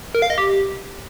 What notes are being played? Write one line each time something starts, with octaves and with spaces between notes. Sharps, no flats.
A#4
F5
D#5
G4